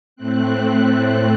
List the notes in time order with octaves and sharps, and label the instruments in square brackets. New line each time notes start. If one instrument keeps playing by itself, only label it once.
[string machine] A2 A3 C4 F#6